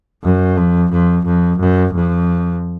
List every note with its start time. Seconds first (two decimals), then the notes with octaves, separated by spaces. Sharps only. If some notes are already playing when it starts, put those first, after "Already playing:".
0.24 F#2
0.57 F2
0.92 F2
1.25 F2
1.59 F#2
1.94 F2